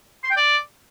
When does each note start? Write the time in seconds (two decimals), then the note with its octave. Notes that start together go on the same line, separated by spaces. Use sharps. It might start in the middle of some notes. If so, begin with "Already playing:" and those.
0.24 C6
0.30 G5
0.37 D5